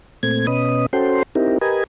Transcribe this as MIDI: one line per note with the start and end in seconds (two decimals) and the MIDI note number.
0.23 0.46 46
0.23 0.46 57
0.23 0.46 60
0.23 0.46 92
0.47 0.86 47
0.47 0.86 61
0.47 0.86 71
0.47 0.86 75
0.47 0.86 87
0.93 1.23 61
0.93 1.23 66
0.93 1.23 69
0.93 1.23 72
0.93 1.23 79
0.93 1.23 84
1.35 1.58 60
1.35 1.58 63
1.35 1.58 64
1.35 1.58 67
1.35 1.58 70
1.61 1.84 67
1.61 1.84 70
1.61 1.84 71
1.61 1.84 75
1.61 1.84 80